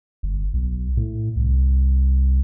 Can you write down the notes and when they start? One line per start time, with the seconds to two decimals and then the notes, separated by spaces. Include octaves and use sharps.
0.23 G1
0.53 B1
0.97 A2
1.36 C2